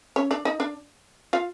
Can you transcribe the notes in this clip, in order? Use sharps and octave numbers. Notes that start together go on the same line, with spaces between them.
C#4 C#5
D4 D5
D#4 D#5
D4 D5
F4 F5